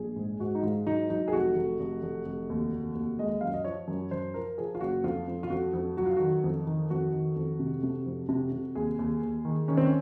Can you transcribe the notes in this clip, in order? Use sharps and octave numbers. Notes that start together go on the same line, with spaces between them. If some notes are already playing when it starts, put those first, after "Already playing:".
Already playing: A#1 G#4
G#2
G#2 F#4
D#4
G#2 F4
F#3 D#4
F#3 D#4
G#4
F1 F#4
F1
F1
F1
F1
D#2
F1
D#2
G#3 D#5
F#2 F5
D#5
F3 C#5
F#2
F#2 C5
F3 A#4
F3 G#4
F4
F#1 F#4
F2 F4
F2
F4
F2 F#4
F2
F#3 F#4
F4
D#3 F#4
F2
D#3
F2 F#4
D#3
F2
C3
C3
F2
C3
C3
D#2 G#4
D#2
D#2
D#3
D#3 C#4
C4
C#4